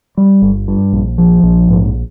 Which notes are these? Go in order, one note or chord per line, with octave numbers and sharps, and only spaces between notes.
G3
G1
G2
A#1
F3
A#1
G#2